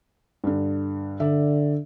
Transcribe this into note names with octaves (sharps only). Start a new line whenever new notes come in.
G2 D3
D3 D5 E5